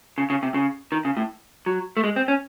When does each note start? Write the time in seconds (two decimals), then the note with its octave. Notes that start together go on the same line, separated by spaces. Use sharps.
0.18 C#3
0.30 C#3
0.43 C3
0.54 C#3
0.92 D#3
1.05 C#3
1.17 A2
1.66 F#3
1.97 A3
2.04 G#3
2.16 C4
2.28 C#4